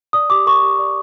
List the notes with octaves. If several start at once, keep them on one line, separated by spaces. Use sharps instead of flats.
D5 D#6
G4 D6
A#4 C#6
G4
D5